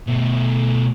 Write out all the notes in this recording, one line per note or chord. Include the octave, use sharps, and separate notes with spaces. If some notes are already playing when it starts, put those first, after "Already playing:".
B2 A3